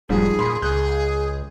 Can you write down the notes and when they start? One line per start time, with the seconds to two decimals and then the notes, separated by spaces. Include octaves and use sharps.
0.09 E1 G#2 F3 G3 G#4
0.39 A#2 B5 C6
0.62 C#2 G#4 F#6 G6